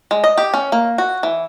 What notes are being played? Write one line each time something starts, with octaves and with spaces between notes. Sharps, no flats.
G#3
D#5
G4
C#4
A#3
F#4
E3